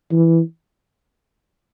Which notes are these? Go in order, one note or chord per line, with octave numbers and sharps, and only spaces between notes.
E3